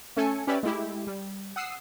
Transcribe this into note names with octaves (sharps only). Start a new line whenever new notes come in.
A3 C#4 A4 G#5 C#7
C#4 G4 B4 D5 E5
G#3 A3 E4 G4
G3
F#5 D#6 E6 C7